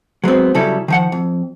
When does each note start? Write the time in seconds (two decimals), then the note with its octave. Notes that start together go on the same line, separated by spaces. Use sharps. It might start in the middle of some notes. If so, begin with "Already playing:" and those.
0.24 F#3 G#3 B3 C4
0.54 C#3 F#3 G3 E4 A4
0.88 D#3 F3 F#5
1.12 F2